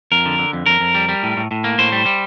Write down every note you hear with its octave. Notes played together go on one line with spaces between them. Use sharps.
F2 A#4
D3
D3
F2
F2 A#4
F2
G3
G3
A2
A2
A2
A#3
A2 C5
G3
G3